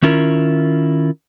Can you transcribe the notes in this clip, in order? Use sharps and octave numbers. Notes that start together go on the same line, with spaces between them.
D#3 C#4 E4 F4 A#4